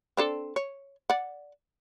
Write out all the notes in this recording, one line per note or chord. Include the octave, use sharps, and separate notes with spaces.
C4 D4 A4
C#5
D5 F#5